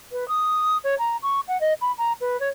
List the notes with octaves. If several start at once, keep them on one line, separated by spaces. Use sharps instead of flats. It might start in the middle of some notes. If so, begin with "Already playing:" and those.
B4
D#6
C#5
A#5
C#6
F#5
D#5
B5
A#5
B4
C#5